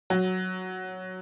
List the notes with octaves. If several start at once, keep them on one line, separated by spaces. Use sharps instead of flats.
F#3